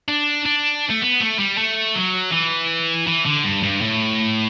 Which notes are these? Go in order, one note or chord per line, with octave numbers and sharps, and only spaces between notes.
D4
D4
A3
B3
A3
G3
A3
F#3
E3
E3
D3
G2
G2
A2